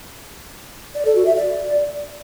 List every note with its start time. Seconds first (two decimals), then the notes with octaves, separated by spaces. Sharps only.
0.95 D5
1.05 A4
1.15 F#4
1.26 E5
1.36 D5